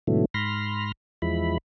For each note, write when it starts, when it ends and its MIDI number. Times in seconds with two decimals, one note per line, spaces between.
0.07 0.25 44
0.07 0.25 47
0.07 0.25 50
0.07 0.25 52
0.07 0.25 54
0.07 0.25 57
0.34 0.92 44
0.34 0.92 83
0.34 0.92 84
0.34 0.92 89
0.34 0.92 94
1.22 1.58 40
1.22 1.58 53
1.22 1.58 56
1.22 1.58 64
1.22 1.58 83